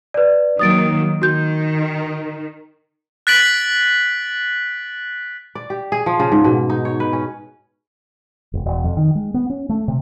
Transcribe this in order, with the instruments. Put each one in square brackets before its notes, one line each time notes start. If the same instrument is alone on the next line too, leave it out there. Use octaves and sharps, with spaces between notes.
[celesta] B4 D5
[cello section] D#3 F#3 A#3 [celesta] D#6 A6 D7
[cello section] D#3 [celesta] F#4 G6
[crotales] F#6 A6 B6 D7 F#7
[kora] D5
G4
G#4
F3
C#3
G#2
B2
D#4
C#5
B4
C#4
[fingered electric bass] F1
E1
F2
D#3
G#3
B3
C#4
A3
C3